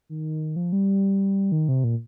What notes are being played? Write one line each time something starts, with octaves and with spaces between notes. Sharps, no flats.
D#3
F3
G3
D#3
C3
A#2